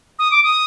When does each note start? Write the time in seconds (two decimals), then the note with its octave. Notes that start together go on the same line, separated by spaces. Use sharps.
0.19 D#6
0.31 D6
0.43 D#6